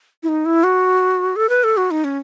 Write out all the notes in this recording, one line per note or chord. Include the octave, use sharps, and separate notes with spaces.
E4
D#4
E4
F#4
A4
B4
A4
F#4
D#4
C#4